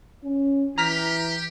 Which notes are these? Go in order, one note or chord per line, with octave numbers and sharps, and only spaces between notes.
C#4
E3 G4 A#5 F6 B6